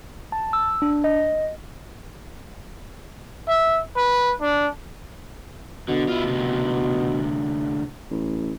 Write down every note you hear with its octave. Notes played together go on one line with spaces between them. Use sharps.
A5
E6
D4
D#5
E5
B4
D4
B2 D3
E4 F4
D2 C3
A1